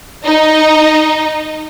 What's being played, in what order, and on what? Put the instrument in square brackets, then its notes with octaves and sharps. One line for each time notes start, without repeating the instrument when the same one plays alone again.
[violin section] D#4 D#5 A#5